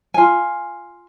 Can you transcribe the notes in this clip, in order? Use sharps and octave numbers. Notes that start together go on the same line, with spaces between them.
F4 G#5